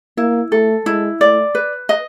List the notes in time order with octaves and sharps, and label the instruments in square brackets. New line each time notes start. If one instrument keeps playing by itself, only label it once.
[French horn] A#3 [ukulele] E4
[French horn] A3 [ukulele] A4
[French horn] G#3 [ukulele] E4
[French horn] A3 [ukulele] D5
[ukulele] B4
D#5